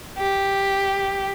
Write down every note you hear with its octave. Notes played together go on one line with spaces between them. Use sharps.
G4